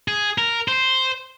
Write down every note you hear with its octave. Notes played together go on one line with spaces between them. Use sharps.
G#4
A#4
C5